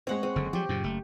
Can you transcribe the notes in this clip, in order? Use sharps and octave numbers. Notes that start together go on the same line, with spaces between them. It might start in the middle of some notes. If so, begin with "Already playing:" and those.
G#3 C4 C#5 F#5
G#3 C4
F#1 D3
F3 F#3 G4
F#2 A#2 C#3
F#1 A3